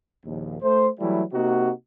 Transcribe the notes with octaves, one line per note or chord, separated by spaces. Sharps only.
A#1 D#2
A3 C5
E3 F#3 G3 A3 E4
C3 A#3 D#4 F#4